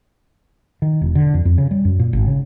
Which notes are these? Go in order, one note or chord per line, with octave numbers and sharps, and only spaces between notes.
D#3
E1
D3
F2
F2
C#3
G3
F#2
A#2
G#1
C#3